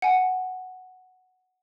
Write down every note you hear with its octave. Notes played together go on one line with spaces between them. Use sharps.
F#5 G#5